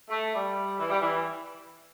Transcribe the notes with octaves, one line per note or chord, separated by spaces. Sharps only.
A3
G3
E3
G3
E3